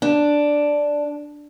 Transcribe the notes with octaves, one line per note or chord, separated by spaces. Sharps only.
D4